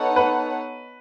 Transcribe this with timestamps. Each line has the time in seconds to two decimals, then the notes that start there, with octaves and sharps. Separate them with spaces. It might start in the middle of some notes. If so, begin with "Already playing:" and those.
Already playing: B3 D#4 A4 C#5 F#5
0.16 B4